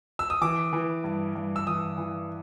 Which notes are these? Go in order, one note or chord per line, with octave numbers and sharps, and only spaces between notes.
E6
D#6
E3 D6
E3
G2
G2
E6
E3 D#6
E3